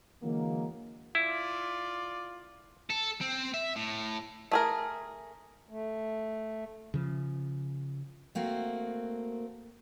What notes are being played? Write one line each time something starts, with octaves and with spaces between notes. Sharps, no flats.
D3 E3 F#3 G#3 A#3
E4 F4 D5
A4
C4
E5
A2
A3 G#4 A#4
A3
C#3 F3
A3 A#3 C4 F#4